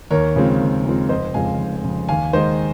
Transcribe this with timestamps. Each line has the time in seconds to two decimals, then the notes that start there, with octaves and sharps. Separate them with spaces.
0.11 D#2 A#4 C#5
0.36 C#3 F3 G#3 C4
0.60 D#2
0.85 C#3 F3 G#3 C4
1.09 F1 C5 D#5
1.34 F2 C#3 G#3 F5 G#5
1.59 F1
1.84 F2 C#3 G#3
2.09 D#2 F5 G#5
2.33 D#3 G#3 C5 D#5